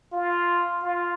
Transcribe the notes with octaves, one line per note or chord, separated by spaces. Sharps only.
F4
F4